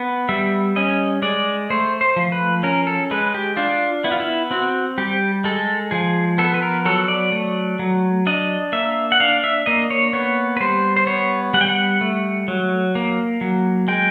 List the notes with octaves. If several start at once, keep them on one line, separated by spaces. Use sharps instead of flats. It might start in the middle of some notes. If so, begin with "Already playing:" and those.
Already playing: B3
G3 E5
C#4 D#5
G#3 D5
A3 C5
C5
F3
B4
C#4 A#4
A4
G#3 B4
G4
D4 F4
B3 E4
F4
E4
C4 F#4
G3 G4
G#3 A4
F3 G#4
B3 A4
B4
A#4
F#3 A4
D5
A3
F#3
D4 D#5
A#3 E5
F#5
D4 F5
E5
A#3 D#5
C#5
B3 C#5
B4
G3 C5
C5
B3 C#5
G3 F#5
G5
F#5
A3
F#3
A#3
F#3
G#3 G5